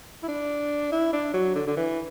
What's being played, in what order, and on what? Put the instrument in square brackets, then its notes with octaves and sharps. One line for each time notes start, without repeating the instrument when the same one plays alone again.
[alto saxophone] E4
D4
E4
D4
F#3
D3
D3
E3